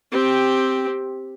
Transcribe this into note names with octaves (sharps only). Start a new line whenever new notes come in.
C4 G4